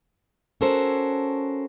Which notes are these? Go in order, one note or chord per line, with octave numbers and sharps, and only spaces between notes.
C#4 F#4 A4 A#4 C5